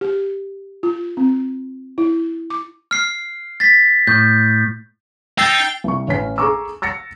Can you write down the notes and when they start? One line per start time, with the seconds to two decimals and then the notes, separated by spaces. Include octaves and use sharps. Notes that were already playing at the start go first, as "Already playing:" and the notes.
0.01 G4
0.83 F4
1.17 C4
1.98 E4
2.50 D6
2.91 F6 C7
3.60 A6 B6
4.07 A2 G6
5.38 D#4 G5 E6 A6 C7 F7
5.84 C2 C#6
6.08 A1 C#4 B6
6.38 G#4 A4 A#5 C#6 D6 E6
6.82 E6 A6 A#6 C#7